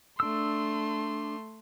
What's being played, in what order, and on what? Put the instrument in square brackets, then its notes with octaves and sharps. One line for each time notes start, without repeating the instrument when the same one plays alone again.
[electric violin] A3 C6 [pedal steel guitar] D4 E6